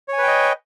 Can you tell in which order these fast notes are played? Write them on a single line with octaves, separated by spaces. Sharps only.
C#5 G#5 B4 G5 D#5